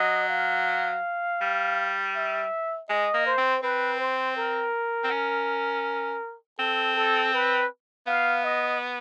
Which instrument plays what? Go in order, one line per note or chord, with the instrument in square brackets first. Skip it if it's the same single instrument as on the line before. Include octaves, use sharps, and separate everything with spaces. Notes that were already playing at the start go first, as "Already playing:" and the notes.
Already playing: [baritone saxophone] F#3 [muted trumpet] D#5
[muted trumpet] F5
[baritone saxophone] G3
[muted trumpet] E5
[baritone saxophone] G#3 [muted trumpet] D#5
[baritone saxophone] A#3
[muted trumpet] C5
[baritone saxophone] C4
[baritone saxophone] C4 [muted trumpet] B4
[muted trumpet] C5
A#4
[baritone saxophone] C4
C#4
[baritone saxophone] C4 [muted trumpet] A4
[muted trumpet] A4
B4
[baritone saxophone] B3 [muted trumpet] F5
[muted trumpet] D#5